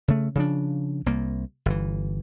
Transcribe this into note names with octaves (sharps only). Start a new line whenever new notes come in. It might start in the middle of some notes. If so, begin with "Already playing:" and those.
C#3 A3
C#3 F3 D4
C2 A#3
G1 E3